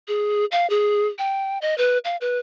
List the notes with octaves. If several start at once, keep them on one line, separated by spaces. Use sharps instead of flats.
G#4
F5
G#4
G5
D#5
B4
F5
B4